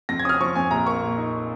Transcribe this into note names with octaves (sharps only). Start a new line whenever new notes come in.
F2 A#6
G#6
C#4 D#6
F6
F3 C#6
F2 G#5
A#1 A#5
A#3 C#6
A#2
D#4